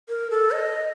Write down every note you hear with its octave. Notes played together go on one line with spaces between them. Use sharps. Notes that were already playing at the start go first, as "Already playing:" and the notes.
A#4
A4
D#5